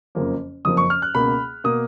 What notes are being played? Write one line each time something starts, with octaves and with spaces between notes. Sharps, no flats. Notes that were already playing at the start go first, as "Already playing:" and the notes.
F#1 F2 C#3 F3 A#3
F#1 F2 C#3 F3 A#3 D#6
C#6
F6
F#6
C#2 B2 A#3 B5
B2 A#3 D#6